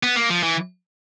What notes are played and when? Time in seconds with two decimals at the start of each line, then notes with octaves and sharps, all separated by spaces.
0.03 B3
0.16 A#3
0.30 F3
0.43 E3